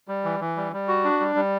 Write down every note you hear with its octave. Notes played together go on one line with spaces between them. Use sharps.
G3
E3
E3
G3
G3
F#4
D4
G3
G3